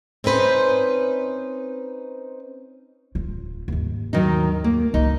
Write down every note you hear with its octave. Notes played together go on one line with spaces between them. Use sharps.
C4 C#4 D#4 B4 C5
D1 F4
D#2 G#2
D#3 F#3 D#4
A#3
C#2 D#3 D#4